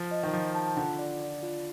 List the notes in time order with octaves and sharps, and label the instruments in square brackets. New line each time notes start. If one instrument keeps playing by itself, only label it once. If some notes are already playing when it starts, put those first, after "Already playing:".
Already playing: [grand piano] F3
[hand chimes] D#5
[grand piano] D#3
[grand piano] F3 [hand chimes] F4
[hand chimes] A5
[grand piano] D3 [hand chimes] F4
[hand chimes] D5
D5
F4